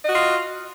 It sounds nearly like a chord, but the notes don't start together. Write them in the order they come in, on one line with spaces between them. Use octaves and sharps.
D#5 F#4 F4